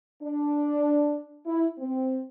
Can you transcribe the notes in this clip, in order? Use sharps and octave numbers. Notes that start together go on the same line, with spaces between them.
D4
E4
C4